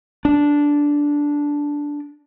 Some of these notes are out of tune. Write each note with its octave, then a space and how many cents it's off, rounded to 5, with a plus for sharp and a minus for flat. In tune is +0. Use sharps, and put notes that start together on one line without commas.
D4 -10